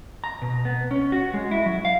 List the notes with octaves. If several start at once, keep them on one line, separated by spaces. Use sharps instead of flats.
A#5
B2
B3
C#4
F#4
G#3
E4
F#3
F5